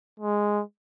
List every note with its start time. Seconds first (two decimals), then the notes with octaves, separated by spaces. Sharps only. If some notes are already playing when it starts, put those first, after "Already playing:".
0.19 G#3